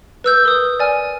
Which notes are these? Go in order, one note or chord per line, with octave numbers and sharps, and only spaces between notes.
B4 E6 G6
A#4 D#6
D5 G#5 F6